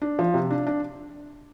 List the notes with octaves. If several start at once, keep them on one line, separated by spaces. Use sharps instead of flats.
D4
F3
C3
D4
D4